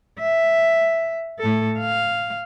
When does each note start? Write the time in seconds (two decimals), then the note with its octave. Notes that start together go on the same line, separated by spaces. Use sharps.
0.19 E5
1.39 A2 A4
1.79 F5